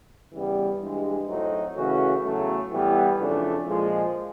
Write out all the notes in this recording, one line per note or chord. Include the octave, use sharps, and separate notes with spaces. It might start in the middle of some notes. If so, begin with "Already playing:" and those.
C#3 E3 G3 B3
G2 E3 G#3
A2 F#3 A3 C4 D#4
C#3 E3 A3 C#4 F#4
E2 C#3 F#3 A3
A2 E3 G3 B3
F2 C#3 E3 A3 D4
A#2 F3 G#3